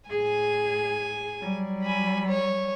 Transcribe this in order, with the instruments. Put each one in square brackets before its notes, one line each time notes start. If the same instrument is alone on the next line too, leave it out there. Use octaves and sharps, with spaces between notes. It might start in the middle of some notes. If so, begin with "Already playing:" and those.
[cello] A2 G#4 [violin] G#5
[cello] F#3 G3
[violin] G#5 B5
C#5